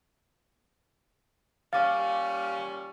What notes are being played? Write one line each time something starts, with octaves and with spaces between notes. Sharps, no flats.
A#2 G3 C#4 F5 C#6 D6 A6